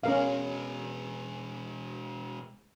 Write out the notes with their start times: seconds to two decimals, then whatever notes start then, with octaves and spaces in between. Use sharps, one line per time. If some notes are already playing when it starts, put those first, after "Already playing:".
0.03 B2 G#3 C#4 A#4 F5